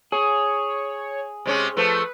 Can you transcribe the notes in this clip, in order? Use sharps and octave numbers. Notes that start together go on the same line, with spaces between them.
G#4 C#5
C3 G#3 C#4
F3 A3 B4